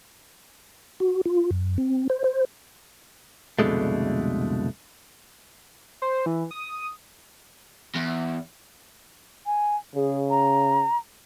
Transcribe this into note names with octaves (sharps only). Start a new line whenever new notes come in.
F#4
F4
F#2
C4
C5
C5
C2 F2 B2 D3 G#3 A3
C5
E3
D#6
E2
G#5
C#3 G#4
A#5